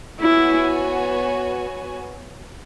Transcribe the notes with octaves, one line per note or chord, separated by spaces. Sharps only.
B3 E4 F#4 C#5 G#5